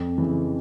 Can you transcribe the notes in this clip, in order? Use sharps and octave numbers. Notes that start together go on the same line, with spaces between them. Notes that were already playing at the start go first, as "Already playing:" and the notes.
Already playing: F2
C#3 E3